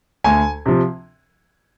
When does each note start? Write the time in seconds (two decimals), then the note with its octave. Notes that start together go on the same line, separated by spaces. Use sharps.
0.24 D2 G#5
0.66 C3 F3